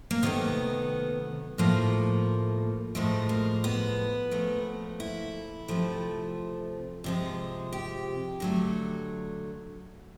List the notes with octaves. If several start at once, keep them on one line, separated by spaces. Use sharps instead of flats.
A#3
C3 D#3 F#3 A3 B3
A2 F3 A3 A#3
A2 F3 G#3 A3
A#3
B3
A#2 F3 A3
E4
C3 F3 A3
C3 F3 G#3
G4
D3 F#3 A3